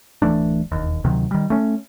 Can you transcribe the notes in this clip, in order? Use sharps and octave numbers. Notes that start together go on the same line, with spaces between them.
D1 E3 A3 D4
E1 D#2
D2 C3 D#3 F#3
D#3 G3
A3 C#4